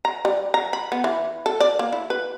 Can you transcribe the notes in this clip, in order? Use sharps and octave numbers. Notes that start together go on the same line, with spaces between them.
A#5
G3
A#5
B5
B3
E3
A4
D5
A#3
E4
B4